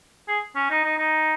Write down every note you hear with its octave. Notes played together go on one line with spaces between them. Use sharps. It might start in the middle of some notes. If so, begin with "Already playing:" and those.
G#4
C#4
D#4
D#4
D#4